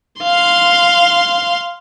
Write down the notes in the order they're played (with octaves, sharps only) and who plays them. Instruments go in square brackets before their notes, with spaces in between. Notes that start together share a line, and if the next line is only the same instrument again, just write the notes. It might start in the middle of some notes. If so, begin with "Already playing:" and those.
[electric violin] F5 C6